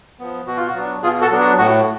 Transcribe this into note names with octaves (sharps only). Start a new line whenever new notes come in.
F3 B3
B2 F#4
F4
F#4
F#3 B3 D4
B2 F4 G#4
F#4 A4
F#3 B3 D4
F#4
A2 F#4